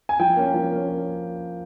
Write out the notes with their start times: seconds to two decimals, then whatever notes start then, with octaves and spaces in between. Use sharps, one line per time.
0.09 G#5
0.19 F3 G5
0.36 A#3 C#4
0.54 F3
0.71 A#3 C#4